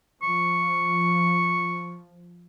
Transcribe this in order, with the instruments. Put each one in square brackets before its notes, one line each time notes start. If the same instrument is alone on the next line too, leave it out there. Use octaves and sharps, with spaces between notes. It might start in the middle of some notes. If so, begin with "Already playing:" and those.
[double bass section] F3 [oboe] C#6